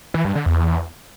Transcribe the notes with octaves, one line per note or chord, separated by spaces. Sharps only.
E3
G2
D3
E2